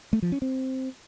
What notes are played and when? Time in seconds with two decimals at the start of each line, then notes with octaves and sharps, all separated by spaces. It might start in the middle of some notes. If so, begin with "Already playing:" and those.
0.13 A3
0.22 F3
0.32 C#4
0.42 C4